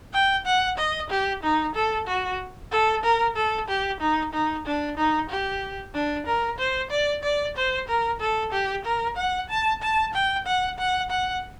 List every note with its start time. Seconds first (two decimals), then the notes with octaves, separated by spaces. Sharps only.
0.13 G5
0.46 F#5
0.78 D#5
1.09 G4
1.43 D#4
1.75 A4
2.07 F#4
2.72 A4
3.03 A#4
3.36 A4
3.68 G4
4.00 D#4
4.33 D#4
4.66 D4
4.97 D#4
5.29 G4
5.94 D4
6.26 A#4
6.58 C5
6.91 D5
7.23 D5
7.56 C5
7.88 A#4
8.20 A4
8.52 G4
8.84 A#4
9.17 F#5
9.49 A5
9.82 A5
10.14 G5
10.46 F#5
10.78 F#5
11.10 F#5